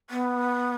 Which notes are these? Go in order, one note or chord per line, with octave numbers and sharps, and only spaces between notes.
B3